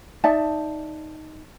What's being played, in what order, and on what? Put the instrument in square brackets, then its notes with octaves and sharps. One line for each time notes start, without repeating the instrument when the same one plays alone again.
[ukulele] D#4 D5 E5 A5